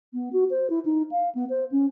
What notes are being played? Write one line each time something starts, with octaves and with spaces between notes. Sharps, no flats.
B3
F#4
C5
E4
D#4
F5
B3
C5
C#4